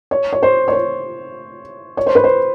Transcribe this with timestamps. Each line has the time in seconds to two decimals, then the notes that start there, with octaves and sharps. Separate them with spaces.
0.11 C#5
0.33 C#5
0.43 C5
0.68 C#5
0.73 C5
1.97 C#5
2.06 C5
2.15 B4
2.24 C5